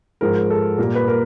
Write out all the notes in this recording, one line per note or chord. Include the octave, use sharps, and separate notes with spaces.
G#2 F3 G#3 A#4
A4
A#2 G3 A#3 A#4
B4
A#4